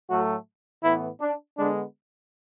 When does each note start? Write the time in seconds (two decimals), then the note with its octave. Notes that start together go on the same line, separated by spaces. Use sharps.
0.08 A2 F#3 A3 F#4
0.83 A2 E3 B3 E4
1.20 D4
1.57 D3 G#3 B3 D4